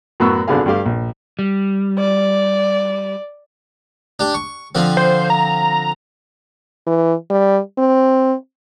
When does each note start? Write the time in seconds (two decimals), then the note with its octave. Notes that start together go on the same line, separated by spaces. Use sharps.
0.20 F#2 A2 B3 F#4 C#6 E6
0.47 G#1 D3 B3 G4 G#4 F5
0.66 G2 A3 G4 F5
0.86 A#1
1.39 G3
1.99 D5
4.20 D4 G4
4.34 C#6
4.75 D3 F3 C4
4.97 C5
5.30 A#5
6.87 E3
7.30 G3
7.78 C4